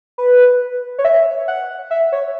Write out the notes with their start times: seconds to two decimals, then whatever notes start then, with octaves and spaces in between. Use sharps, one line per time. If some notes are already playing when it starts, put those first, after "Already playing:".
0.18 B4
0.99 C#5
1.05 E5
1.48 F#5
1.91 E5
2.12 C#5